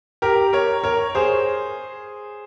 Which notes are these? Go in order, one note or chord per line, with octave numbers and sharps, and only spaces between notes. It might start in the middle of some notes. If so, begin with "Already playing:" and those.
G4 A#4
A#4 C#5
A#4 C#5
G#4 C5